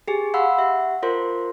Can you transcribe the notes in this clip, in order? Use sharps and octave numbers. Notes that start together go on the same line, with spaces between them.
G4 G#4 G#5
F5 F#5 B5 C6 E6
G4 E5 F#5
F4 A#4 C5 C6